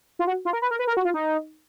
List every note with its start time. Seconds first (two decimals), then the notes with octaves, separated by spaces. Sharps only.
0.19 F4
0.27 F#4
0.45 F4
0.53 A#4
0.62 B4
0.71 A#4
0.79 B4
0.87 A#4
0.97 F#4
1.05 F4
1.14 D#4